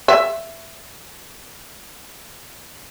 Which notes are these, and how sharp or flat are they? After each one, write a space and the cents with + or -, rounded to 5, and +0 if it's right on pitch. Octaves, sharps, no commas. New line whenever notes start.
E5 +10